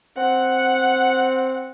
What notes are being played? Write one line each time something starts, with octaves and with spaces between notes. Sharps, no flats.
C4 F#5